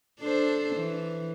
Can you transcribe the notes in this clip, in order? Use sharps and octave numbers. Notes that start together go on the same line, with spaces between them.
D4 A4 C5
E3